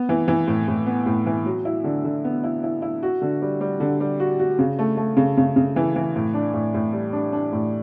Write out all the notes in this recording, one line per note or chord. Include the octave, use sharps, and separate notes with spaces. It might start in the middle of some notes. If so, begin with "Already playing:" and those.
Already playing: B3
E3
E3
A2
A2
B3
A2
E3
F#3
E4
D3
D3
B3
E4
E4
E4
F#4
D3
G3
G3
D3
G3
F#4
F#4
C#3
A3
A3
C#3
C#3
C#3
E3
E3
A2
D4
A2
A2
G3
D4
D4
A2